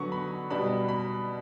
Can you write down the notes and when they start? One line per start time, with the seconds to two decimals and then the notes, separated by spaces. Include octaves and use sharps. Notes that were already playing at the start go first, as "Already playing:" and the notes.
Already playing: D3 F#3 B3 F#5 C#6
0.12 B5
0.50 B2 G3 D4 B5
0.88 B5